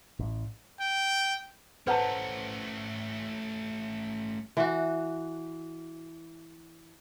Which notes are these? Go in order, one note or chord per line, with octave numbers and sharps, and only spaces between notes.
A1
G5
A3 C#4 B4 C5 F#5 A5 A#5
E3 F#4